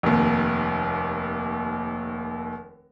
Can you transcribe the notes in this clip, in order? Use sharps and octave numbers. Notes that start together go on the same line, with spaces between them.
F1 D#2